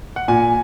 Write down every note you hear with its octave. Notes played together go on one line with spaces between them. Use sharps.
F#5
A#2 G#5